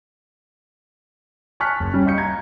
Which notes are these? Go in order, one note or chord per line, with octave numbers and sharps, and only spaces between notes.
G#5 A5 C#6 F6 F#6 B6
F#1
G3 C#4
D#5 F5 C#6 G6 C#7
A#5 G#6